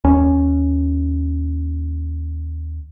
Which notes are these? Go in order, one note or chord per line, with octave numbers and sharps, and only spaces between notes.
D#2 C#4